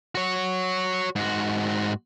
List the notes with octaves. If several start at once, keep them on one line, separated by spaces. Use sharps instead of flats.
F#4 C#5
G#2 F#4